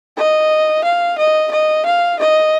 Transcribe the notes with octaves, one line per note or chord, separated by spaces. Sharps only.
D#5
F5
D#5
D#5
F5
D#5